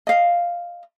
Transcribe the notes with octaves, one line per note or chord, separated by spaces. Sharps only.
D#5 F5